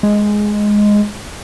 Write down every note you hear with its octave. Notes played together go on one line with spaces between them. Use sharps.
G#3